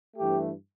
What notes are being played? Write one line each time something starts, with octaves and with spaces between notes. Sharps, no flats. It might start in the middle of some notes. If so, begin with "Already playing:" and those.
G2 E3 A3 G4